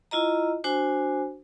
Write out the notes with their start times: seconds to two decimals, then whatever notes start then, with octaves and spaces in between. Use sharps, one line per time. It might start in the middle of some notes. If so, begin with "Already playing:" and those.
0.11 E4 F4 D#5 A#5
0.64 D4 F#4 C5 G#5